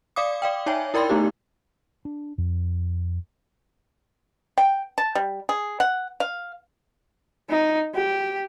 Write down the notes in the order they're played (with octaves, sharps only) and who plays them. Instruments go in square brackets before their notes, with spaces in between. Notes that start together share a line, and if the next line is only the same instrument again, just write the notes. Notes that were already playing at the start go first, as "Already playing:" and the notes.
[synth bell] D5 F5 D6 D#6
D5 F5 G5
D#4 C#5 E5 G5 G#5
E4 A#4 D5 G5 B5 C6
A3 B3 D#4 G4
[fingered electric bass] D4
F2
[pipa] G5
A5
G3
G#4
F#5
F5
[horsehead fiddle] D#4
G4